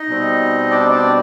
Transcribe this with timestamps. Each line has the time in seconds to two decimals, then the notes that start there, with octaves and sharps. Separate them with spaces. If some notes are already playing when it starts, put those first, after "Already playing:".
Already playing: D#4 D#5
0.08 B2 G3 C4
0.71 D4 D5
0.91 D4 D5